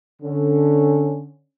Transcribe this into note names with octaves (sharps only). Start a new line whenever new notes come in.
D3 C#4